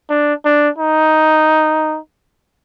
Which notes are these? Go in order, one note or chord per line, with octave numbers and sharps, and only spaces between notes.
D4
D4
D#4